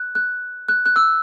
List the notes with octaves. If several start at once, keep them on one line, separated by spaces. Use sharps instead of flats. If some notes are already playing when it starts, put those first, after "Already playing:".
Already playing: F#6
F#6
F#6
F#6
E6